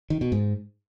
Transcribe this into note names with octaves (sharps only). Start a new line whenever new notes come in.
D#3
B2
G#2